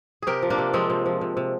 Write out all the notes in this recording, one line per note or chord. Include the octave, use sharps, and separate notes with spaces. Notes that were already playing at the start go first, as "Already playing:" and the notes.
C3 G4 G#4 A#4
F3
A#3 D4
C3
F3 G#3 C4
C3
F3
C3
C3